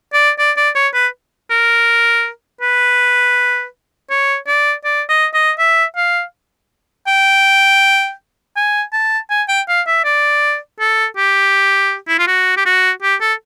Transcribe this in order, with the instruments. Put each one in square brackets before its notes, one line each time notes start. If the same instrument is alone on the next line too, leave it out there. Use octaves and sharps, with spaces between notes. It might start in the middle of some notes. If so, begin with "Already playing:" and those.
[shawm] D5
D5
D5
C#5
B4
A#4
B4
C#5
D5
D5
D#5
D#5
E5
F5
G5
G#5
A5
G#5
G5
F5
E5
D5
A4
G4
E4
F4
F#4
G4
F#4
G4
A4